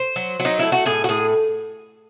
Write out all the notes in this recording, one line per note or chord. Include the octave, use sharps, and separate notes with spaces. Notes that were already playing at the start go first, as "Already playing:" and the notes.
Already playing: C5
F#3
F#3
D#4
A3 E4
F#4
A2 G#4
F#4
A2 G#4